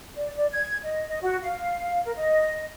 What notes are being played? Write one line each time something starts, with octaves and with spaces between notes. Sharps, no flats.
D5
D5
G#6
D#5
D#5
F#4
F5
A#4
D#5